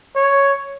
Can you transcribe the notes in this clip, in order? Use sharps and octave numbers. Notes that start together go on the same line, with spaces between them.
C#5